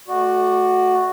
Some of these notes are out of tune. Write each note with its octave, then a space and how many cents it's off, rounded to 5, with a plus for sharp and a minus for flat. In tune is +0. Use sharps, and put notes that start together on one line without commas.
A3 -25 F#4 +0 D5 +15